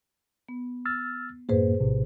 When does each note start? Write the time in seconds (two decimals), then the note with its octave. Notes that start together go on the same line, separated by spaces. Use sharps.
0.49 B3
0.86 E6 F6 A6
1.49 F#2 A2 A#3 G#4 B4 C5
1.80 A#1 A2 C3